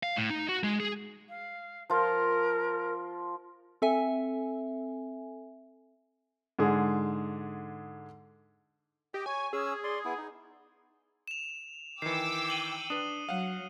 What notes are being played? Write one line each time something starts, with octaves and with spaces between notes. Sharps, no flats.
F5
A2
D#4
F#4
G#3
G#4
F5
F3 F4 A#4
C4 A4 E5 G#5
G#2 D3 G#4
G4 D#5 G5
C#5 G#5
C#4 G#4 E6
D5 C6
B3 E4
D#4
E7 F7
D#3 E3 G5 D6 E6 C7 C#7
D#7 F#7 G7
D4 B4 D#6 D#7
F#3 F5 F#5